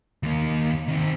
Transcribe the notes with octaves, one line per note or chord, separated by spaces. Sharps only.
D#2 A#3
D#3 C4